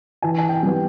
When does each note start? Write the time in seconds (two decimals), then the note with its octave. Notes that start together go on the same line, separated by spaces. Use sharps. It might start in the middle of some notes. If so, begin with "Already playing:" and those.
0.22 E3 G#5
0.38 G#5
0.49 G5
0.63 G3 B3